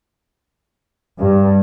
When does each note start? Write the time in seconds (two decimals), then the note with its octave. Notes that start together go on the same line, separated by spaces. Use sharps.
1.20 G2